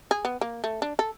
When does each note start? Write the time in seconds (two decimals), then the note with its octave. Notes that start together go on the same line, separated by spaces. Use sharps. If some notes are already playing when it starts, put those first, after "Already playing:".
0.11 G#4
0.25 B3
0.41 A#3
0.64 A3
0.82 D4
0.99 A4